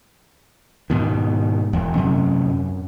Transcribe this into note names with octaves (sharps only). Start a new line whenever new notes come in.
G#2 B2 D#3
E1 E2
F#2 C3 F#3 C#4
F#2